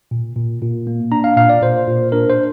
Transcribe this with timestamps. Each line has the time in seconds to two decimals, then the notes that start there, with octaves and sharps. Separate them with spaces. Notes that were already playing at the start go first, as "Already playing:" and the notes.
0.11 A#2
0.36 A#2
0.62 A#2
0.87 A#3
1.12 D4 A#5
1.24 F5
1.37 A#2 F5
1.49 D5
1.62 A#2 C5
1.87 A#2
2.12 D4 A#4
2.30 C5